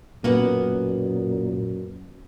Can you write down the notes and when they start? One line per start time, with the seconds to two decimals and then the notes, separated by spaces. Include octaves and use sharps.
0.24 F#2 A#2 A#3 B3 F#5 G#5